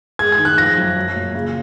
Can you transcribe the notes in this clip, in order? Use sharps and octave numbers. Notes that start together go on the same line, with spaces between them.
G#3 G#6
G#6
D#3
F#6
F3 A#6
F#2
F#3
A#2
C#3